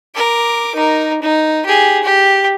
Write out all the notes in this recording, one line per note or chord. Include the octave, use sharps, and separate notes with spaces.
A#4 D6
D#4 A#4
D#4
G4 G#4
G4